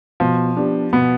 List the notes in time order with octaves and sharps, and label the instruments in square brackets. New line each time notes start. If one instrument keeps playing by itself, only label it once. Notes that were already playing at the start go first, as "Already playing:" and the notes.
[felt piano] B2 [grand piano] F3
[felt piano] B3 D4 G4
[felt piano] B2 [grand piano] B3